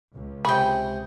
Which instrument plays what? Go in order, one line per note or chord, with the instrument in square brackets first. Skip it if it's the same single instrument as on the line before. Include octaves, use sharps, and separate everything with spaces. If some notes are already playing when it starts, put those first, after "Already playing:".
[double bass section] C#2
[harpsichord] C3 G#3 G#4 [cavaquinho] G5 C#6 [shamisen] B5